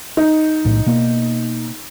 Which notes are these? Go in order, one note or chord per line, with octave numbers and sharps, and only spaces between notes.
D#4
B1 A2
B2 A#3